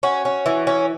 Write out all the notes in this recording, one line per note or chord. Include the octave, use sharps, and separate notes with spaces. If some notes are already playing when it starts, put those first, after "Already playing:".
C#4 F#4
C#4
E3
C#4